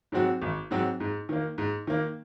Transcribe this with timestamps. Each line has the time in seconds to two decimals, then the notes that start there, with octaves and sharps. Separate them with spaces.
0.12 G#2 F#3 C4 F#4
0.42 G#1
0.71 G#2 F#3 C4 F#4
1.00 G#2
1.29 D#3 A#3
1.58 G#2
1.87 D#3 A#3